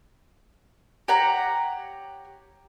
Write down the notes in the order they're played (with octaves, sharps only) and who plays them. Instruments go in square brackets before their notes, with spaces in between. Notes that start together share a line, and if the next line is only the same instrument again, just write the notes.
[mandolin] G4 C#5 F#5 A#5